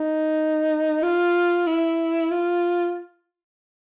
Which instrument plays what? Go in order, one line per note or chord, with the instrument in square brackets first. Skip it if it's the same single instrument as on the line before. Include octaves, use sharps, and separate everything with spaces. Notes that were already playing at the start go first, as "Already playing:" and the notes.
Already playing: [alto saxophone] D#4
F4
E4
F4